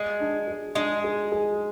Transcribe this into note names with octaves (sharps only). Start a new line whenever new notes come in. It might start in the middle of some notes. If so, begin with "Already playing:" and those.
Already playing: G#3 G#4
D4
G#4
G#3 D4
G#4
G#4